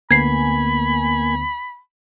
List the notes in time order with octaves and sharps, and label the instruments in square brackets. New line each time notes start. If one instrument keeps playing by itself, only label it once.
[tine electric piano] D2 D3 B3 [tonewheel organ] A#3 G#5 [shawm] B5 [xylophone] G#6 C7